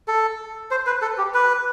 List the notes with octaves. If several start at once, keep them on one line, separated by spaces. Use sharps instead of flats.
A4
C5
B4
A4
G4
B4